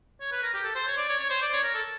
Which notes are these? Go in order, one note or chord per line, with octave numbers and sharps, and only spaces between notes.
C#5
B4
A#4
G4
A4
C5
C#5
D5
C#5
C#5
C5
D5
C#5
A#4
A4